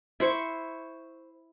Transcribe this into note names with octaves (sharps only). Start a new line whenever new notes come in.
E4 C5 C#6